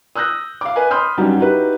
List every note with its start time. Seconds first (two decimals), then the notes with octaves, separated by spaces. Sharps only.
0.16 D#6 E6 F#6 G6 A#6
0.61 F5 D6
0.76 B4 D#5 G#5
0.91 B5 C6 D#6 F6 G6
1.17 G2 F#3 G3 C#4 D#4 F#4
1.39 D#4 E4 F#4 G4 B4